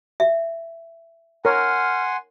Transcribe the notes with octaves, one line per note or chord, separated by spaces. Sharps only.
E5
A#4 C#5 F#5 G#5 C6 F6